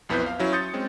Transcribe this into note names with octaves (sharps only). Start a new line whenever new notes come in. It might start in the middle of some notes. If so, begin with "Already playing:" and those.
B1 F2 B3 E4 B4 G6
F5
F#3 C#4 E4
C6 D#6 G6 A6 C#7
G#3 C4 C#4